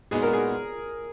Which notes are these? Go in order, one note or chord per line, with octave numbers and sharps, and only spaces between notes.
A#2 G#3 B3 D#4 F#4 G#4
A#4
G#4